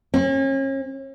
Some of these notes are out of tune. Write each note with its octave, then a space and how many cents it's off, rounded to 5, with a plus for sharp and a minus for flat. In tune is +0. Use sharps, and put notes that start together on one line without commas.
C#4 -40